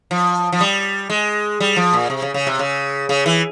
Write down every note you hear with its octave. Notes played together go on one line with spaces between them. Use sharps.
F3
F3
G3
G#3
G3
F3
A#2
C3
C#3
C#3
C3
C#3
C#3
E3